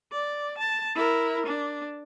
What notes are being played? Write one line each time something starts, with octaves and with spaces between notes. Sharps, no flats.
D5
A5
E4 A#4
D4